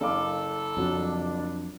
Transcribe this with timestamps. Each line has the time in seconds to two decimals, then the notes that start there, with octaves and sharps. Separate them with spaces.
0.01 F#1 A4 F5 D6
0.77 F2 F#3 D4